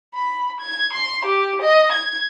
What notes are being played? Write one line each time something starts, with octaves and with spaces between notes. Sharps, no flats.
B5
G#6
C6
G4
D#5
G#6